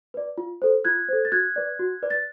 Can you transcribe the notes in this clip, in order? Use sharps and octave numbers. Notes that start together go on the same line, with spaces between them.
B4 D5
F4
A4 C5
F4 F#6 G#6
A4 C5
A6
F#4 F#6 G#6
B4 D5
F#4
B4 D5
A6